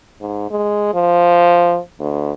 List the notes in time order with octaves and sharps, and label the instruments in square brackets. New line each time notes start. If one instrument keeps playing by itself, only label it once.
[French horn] G#2
G#3
F3
D2